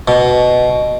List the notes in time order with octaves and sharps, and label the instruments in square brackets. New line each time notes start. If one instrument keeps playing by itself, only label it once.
[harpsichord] B2